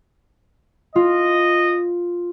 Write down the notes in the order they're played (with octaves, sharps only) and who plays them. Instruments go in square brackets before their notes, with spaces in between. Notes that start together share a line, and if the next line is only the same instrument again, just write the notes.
[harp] F4 [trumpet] D#5